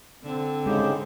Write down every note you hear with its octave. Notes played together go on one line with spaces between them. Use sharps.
D3 C4
G#2 C#3 G#3 G4